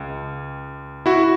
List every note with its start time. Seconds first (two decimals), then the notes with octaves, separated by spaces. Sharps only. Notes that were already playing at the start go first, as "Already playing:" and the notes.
Already playing: C#2
1.06 E4 F#4